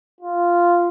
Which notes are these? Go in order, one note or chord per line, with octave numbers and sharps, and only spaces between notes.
F4